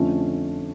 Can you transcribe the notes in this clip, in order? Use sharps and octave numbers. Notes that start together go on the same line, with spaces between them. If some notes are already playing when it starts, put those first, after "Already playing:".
Already playing: F2 D3 F3 A3 C#4